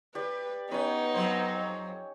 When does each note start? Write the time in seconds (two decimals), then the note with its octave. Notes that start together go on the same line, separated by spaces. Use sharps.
0.15 G4 B4 D5
0.71 B3 C#4 D#4 B4 C#5
1.14 F2 F#3 C5